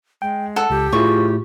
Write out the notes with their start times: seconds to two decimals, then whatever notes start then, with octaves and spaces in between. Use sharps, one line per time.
0.22 G#3 G5
0.56 A4 F#5
0.70 C#2 G4
0.93 A2 E4 F4 G#4 C#6